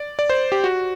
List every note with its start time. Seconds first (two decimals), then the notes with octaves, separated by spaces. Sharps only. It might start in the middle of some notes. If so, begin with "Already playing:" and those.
Already playing: D5
0.19 D5
0.30 C5
0.52 G4
0.64 F#4